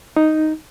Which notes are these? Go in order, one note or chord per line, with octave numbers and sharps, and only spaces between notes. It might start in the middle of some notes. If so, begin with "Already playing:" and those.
D#4